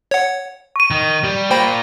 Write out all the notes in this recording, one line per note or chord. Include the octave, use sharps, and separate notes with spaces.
C#5 F#5
C#6 D#7
D#3
G3
A#2 A#3 C5 G5 B5